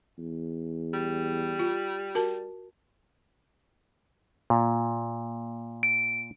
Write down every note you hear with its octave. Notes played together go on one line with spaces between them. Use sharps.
E2
G3
F4
F#4 A#4 A5
A#2
D7